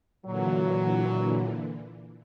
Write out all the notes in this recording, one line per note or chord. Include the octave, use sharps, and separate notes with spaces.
A#2 D3 E3 F#3